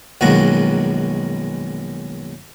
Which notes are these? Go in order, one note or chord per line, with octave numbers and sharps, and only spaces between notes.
A#1 F#2 B2 D#3 G#3 F#4